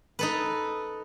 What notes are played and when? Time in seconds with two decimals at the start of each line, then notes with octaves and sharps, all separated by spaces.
0.19 D#4 A4 B4